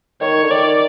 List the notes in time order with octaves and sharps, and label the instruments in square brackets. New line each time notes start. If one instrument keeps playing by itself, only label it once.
[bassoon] D#3 [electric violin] C#5
[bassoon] D3
[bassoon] D#3 [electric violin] D5